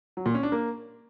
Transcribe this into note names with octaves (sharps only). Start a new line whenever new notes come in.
F#3
A#2
C#4
D4
A#3